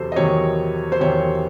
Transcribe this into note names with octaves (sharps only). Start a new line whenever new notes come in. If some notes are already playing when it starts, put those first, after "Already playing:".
Already playing: E2 C3 F#3 A4 C5
D#5
E2 C3 D#3 F#3 C#5
C5
E2 C3 D#3 F#3 C#5